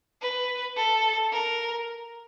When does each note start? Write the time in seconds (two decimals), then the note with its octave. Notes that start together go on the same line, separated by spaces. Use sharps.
0.22 B4
0.77 A4
1.32 A#4